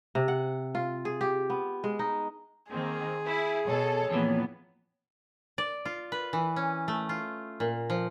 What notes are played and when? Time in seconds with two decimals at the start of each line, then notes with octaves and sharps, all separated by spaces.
0.15 C3
0.28 F#5
0.75 F4
1.05 G#4
1.21 G4
1.50 B3
1.84 G#3
1.99 D#4
2.72 D#3 A#3 C4 G#4
3.26 E4
3.67 B2 A4 C#5
4.11 F2 A#2 E3 B3
5.58 D5
5.85 F4
6.12 B4
6.33 E3
6.56 C#4
6.88 A3
7.09 F4
7.60 A#2
7.90 F3